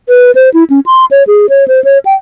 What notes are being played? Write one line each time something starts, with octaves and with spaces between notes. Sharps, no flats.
B4
C5
E4
C#4
C6
C#5
G#4
C#5
C5
C#5
G5